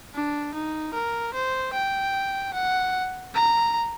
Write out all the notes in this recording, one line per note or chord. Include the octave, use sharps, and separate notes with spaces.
D4
D#4
A#4
C5
G5
F#5
A#5